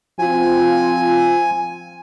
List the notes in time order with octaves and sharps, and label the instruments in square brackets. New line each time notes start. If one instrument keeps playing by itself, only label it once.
[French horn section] F3 C4 F4 [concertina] G#5